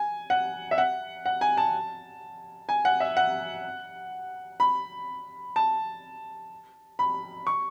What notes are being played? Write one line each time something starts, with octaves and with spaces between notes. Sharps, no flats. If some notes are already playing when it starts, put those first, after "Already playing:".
Already playing: G#5
F#5
E5
F#5
F#5
G#5
A5
G#5
F#5
E5
F#5
B5
A5
B5
C#6